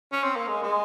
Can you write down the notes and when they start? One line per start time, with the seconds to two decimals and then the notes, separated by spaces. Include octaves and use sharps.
0.12 C#4
0.24 C4
0.36 A#3
0.48 G#3
0.62 G#3